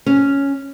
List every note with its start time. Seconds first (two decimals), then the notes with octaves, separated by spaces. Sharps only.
0.06 C#4